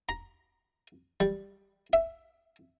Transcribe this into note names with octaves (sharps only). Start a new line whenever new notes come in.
A#5
G3
E5